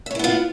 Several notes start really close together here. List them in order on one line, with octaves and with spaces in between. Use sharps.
E5 C#5 E4 B3 F4